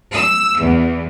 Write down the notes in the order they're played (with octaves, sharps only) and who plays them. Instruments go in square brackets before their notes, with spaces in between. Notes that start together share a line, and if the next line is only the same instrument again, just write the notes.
[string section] E6
E2